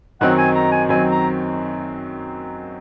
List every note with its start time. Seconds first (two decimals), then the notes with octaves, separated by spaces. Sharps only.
0.21 F#2 D#3 F#3 C4 D#4 F#5
0.38 G#5
0.55 A#5
0.72 G#5
0.89 F#2 D#3 F#3 C4 D#4 G#5
1.11 A#5